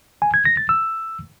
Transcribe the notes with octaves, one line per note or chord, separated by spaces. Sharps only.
G#5
G#6
A#6
A6
E6